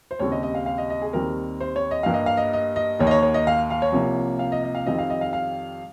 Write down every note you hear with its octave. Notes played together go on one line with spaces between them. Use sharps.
C5
D#2 C#3 G3 C4 C#5
D#5
D#5
F5
F5
D#5
D#5
G#4
D#2 D#3 G3 C4 A#4
C5
C#5
D#5
G2 G3 A#3 F5
D#5
F5
D#5
D#5
D#5
D#2 D#3 A#3 C#5
D#5
C#5
C#5
D#5
F5
F5
C#5
C2 C3 F3 A#3
F5
D#5
D#5
F5
F2 D#3 G3 C4 D#5
F5
D#5
F5
F5